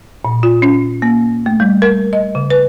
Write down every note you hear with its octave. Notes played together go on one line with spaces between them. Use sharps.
A#2
F4
C#4
A#3
A3
G3
A#4
D#5
C#3
B4